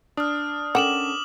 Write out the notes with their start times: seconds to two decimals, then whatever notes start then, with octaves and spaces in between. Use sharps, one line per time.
0.17 D4 D#6 F6
0.75 C#4 A4 A#4 F#5 G5 D6 E7 F#7